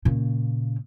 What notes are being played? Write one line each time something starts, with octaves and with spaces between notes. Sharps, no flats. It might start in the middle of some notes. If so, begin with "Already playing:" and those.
A#2 C#3